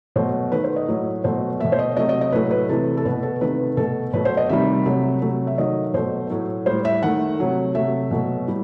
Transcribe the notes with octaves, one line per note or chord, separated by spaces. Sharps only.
B2 F#3 A3 C5
D#3 A3 B4
C5
D#5
A2 F#3 A3
B2 F#3 A3 C5
B2 A3 E5
C5
D#5
C3 F#3 A3 D#5
D#5
D#5
A2 F#3 A3 B4
B4
C3 E3 A3 A4
A4
B2 A3 B4
A4
C3 D#3 A3 B4
B2 A3 A4
B2 F#3 A3 B4
C5
D#5
C3 D#3 G3 E5
C3 F#3 A3
C3 F#3 A3
E5
D#3 F#3 A3 D#5
B2 F#3 A3 C5
A2 F#3 A3
A2 G3 C5
E5
D#3 A3 F#5
C3 F#3 A3
C3 F#3 A3 E5
B2 F#3 A3
A2 G3